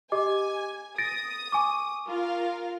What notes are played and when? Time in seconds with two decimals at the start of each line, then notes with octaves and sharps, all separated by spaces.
0.12 G4 D#5 G#5 D6
0.98 D#6 A6 A#6 D7
1.52 G#5 C#6 D6
2.06 F4 A#4 F5